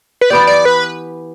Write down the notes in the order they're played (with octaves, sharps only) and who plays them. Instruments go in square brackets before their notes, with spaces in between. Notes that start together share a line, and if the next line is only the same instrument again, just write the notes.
[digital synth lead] B4
[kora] E3 B3 G4 [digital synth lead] D5
[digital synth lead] D5
B4